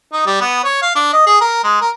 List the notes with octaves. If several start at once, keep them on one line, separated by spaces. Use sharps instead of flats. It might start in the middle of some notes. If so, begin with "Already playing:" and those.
D#4
G3
B3
C#5
F5
D4
D#5
G#4
A#4
G#3
A#4